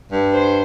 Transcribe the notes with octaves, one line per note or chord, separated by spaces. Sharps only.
G2
C5